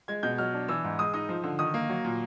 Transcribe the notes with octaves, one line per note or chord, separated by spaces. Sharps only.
G#3 G#6
B2 G6
F#3 F6
D4
E3 E6
G#2
G#3 D#6
D#4 D#6
F3
D3
D#3 D#6
A#3
F#3
A#2